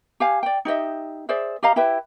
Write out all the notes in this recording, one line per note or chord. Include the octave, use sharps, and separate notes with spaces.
G4 F5 G#5
D5 G5
D#4 G4 D#5 E5
G#4 C5 D5 E5
G4 D#5 F5 A#5
E4 G4 B4 E5